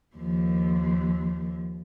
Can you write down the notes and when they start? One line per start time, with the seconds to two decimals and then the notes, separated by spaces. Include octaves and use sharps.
0.15 D#2 F3